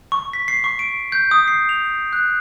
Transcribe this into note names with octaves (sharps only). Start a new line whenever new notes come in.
C#6
B6
C7
C#6
D7
G6
D#6
C7
F7
F#6